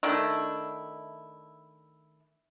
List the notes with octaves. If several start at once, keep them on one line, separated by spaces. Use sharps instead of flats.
D#3 A3 D4 E4